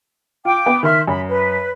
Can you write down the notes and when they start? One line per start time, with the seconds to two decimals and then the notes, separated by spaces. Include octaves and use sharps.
0.45 F4 G5 D6
0.66 B3
0.83 D#3 E5 C6 F6
1.07 F#2 B5
1.28 B4